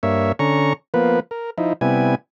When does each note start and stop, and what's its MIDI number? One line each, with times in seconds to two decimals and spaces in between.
0.03 0.32 43
0.03 0.32 58
0.03 0.32 73
0.03 0.32 76
0.39 0.73 50
0.39 0.73 61
0.39 0.73 82
0.39 0.73 85
0.94 1.20 53
0.94 1.20 58
0.94 1.20 59
0.94 1.20 71
1.31 1.50 70
1.58 1.73 53
1.58 1.73 63
1.58 1.73 64
1.81 2.15 48
1.81 2.15 55
1.81 2.15 59
1.81 2.15 64
1.81 2.15 80